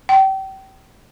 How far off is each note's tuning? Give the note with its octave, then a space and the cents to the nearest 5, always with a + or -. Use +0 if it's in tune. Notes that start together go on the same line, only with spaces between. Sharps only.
G5 -30